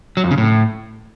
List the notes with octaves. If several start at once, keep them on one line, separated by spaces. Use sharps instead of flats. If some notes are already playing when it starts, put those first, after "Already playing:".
F#3
F2
C#3
A2